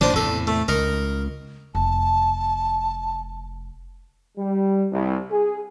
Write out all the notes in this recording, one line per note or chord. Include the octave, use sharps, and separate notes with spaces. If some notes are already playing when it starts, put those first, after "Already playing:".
A1 A#2 D3 D4 C5
E2 A2 C3 A4
A3
C#2 D#4 A#4
F1 A5
G3
C2
G#4